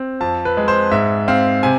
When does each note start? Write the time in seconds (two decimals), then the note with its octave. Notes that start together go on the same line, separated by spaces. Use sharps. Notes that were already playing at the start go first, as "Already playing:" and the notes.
Already playing: C4
0.21 F2 A5
0.45 B4
0.57 G#3
0.68 C5
0.91 G#2 E5
1.28 C4 F5
1.63 C3 G#5